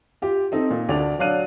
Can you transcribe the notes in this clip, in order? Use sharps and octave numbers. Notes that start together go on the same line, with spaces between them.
F4 G4
C4 D#4 A4
A#2
D2 D4 D5 F7
F#3 D4 F5 F#6 D#7